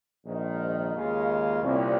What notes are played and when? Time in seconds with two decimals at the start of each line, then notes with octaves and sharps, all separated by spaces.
0.24 A#1 G#2 D#3
0.93 D#2 C#3 G#3 C#4 F4
1.63 C2 A#2 G3 C#4